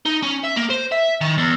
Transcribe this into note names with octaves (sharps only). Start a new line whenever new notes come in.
D#4
C#4
E5
A#3
C5
E5
D#3
E2